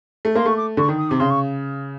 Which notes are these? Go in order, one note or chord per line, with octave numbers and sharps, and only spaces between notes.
A3
A#3 C6
A3 C#6
D6
D3 C#6
D#3
D#6
C3 D6
C#3 C6
C#6